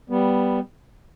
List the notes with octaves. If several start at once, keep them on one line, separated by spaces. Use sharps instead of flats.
G3 B3